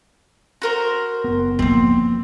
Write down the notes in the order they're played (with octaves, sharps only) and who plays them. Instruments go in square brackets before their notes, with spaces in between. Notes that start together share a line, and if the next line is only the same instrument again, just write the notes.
[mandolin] F#4 A#4 C5
[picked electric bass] F#1 B3
[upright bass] F3 A#3 [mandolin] C4